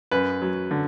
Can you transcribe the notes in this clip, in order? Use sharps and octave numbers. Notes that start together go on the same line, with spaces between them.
F#2 B4
F#3
D3